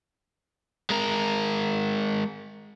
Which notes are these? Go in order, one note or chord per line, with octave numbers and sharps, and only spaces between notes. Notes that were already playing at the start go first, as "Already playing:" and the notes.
G#3 A#4